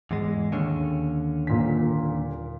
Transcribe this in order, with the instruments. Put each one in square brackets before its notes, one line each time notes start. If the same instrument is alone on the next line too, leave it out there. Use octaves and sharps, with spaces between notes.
[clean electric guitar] E2 G#2 G#3
D#2 D3 C#4
[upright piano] D#1 A#2 B6